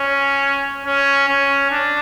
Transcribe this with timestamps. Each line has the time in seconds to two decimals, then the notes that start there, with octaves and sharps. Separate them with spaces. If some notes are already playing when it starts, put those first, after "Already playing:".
Already playing: C#4
0.86 C#4
1.28 C#4
1.71 D4